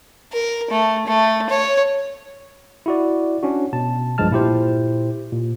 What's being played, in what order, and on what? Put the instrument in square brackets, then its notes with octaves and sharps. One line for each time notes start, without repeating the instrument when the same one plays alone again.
[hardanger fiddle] A#4
A3
A3
C#5
[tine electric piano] E4 F#4 D5
C#4 D4 F#4
B2 A5
B1 G2 F3 G#3 A5 F6
A#2 E4 G4 C5
A#2